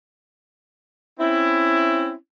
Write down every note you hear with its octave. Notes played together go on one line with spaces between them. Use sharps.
C4 C#4 E4